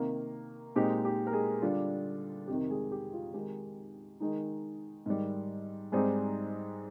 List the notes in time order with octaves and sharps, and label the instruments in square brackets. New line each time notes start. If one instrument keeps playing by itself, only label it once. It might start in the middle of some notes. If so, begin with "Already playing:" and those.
Already playing: [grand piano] C3 D#3 A#3
A#2 G#3 C4 D#4 G4
G4
A#4
G#3 G#4
D3 G3 D4 F4
F2 C3 D#3 G4
G#3 G#4
G4
F4
D#3 G#3 D#4 G4
D#3 G#3 D#4
G#2 D#3 G3
G#2 G3 G#3 C4 D#4 G#4